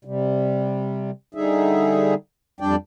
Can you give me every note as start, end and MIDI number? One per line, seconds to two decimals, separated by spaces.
0.05 1.11 48
0.05 1.11 55
1.35 2.14 50
1.35 2.14 55
1.35 2.14 63
1.35 2.14 68
1.35 2.14 76
2.61 2.76 41
2.61 2.76 55
2.61 2.76 62
2.61 2.76 74
2.61 2.76 79